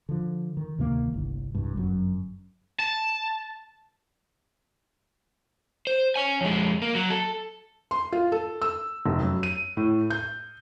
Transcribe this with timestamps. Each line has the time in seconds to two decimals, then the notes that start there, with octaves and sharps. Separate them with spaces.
0.09 D3 F3
0.57 D#3
0.78 D2 C3 D#3 A#3
1.13 G1 C2
1.55 C2 G2
1.75 G1 F#2 F#3
2.80 A5
5.87 C5
6.16 C#5 G#5
6.41 F2 G#3
6.82 A#3
6.95 F#3
7.10 A4
7.91 C6
8.12 F4
8.32 A4
8.62 E6
9.06 F1
9.20 F#2
9.43 D#7
9.77 A2
10.10 G6